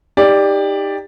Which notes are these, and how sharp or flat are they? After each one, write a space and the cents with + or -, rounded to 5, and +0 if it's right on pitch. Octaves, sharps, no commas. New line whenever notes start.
D#4 +0 G4 +20 D5 +0